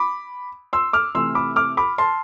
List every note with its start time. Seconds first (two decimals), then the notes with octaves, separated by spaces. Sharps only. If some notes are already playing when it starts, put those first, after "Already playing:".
Already playing: B5 D6
0.73 C6 E6
0.93 D6 F6
1.15 C3 E3 A3 C6 E6
1.35 B5 D6
1.56 D6 F6
1.77 B5 D6
1.98 A5 C6